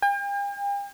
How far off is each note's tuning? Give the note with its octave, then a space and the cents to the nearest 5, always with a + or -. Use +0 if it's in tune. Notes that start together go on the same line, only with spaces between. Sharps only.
G5 +45